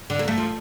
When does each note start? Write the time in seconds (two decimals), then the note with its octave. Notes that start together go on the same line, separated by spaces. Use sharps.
0.10 D3
0.19 A#3
0.28 A3
0.38 F3